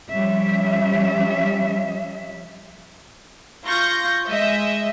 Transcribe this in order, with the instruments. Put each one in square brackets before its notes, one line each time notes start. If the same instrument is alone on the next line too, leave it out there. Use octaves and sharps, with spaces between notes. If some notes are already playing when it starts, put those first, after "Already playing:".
[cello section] F3 G3 C#4 E5
[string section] F4 C#6 G6 A#6
G#3 D#5 E5